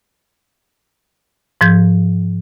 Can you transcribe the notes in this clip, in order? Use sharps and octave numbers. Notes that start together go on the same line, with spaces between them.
G#2 F3 G6 G#6